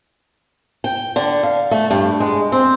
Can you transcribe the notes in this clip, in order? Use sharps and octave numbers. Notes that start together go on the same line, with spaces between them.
G5
D3
F5
A3
G2
G#3
C4